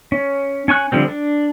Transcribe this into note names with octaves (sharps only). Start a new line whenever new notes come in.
C#4
C#4 G#5 C#6 F#6
D3 F3 G3 C4
D4